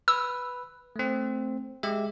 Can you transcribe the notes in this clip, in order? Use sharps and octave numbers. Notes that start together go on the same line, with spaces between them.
B4 E6
A3 C4
G#3 G4 E5